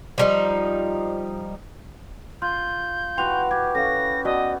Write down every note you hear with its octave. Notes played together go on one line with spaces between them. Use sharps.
F3 G3 D#4
F4 C6 G6
E3 F#4 B4 G5 C6 F7
G4 G#6
C#4 A4 F5 A#6
B3 F#4 A4 D5 D#5 F#5